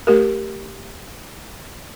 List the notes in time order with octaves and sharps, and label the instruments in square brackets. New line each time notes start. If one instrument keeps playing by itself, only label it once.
[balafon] A3 G4 A#4